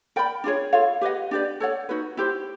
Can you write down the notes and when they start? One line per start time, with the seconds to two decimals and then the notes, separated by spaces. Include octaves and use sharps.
0.16 A#4 D5 G5 B5
0.44 D4 F4 G#4 C#5
0.73 F4 A4 C#5 F5
1.01 G4 B4 D#5 F#5
1.31 D4 G4 B4 D5
1.60 A4 C#5 F#5
1.89 D#4 F#4 B4
2.17 E4 G4 C5